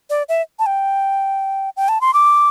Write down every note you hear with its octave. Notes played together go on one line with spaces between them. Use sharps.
D5
E5
A5
G5
G5
A5
C6
D6